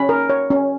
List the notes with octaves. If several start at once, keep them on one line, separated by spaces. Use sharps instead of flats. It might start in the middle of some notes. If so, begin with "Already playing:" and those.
Already playing: C#4 B5
A#4
C#5
C#4